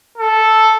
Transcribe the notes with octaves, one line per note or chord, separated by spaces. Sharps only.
A4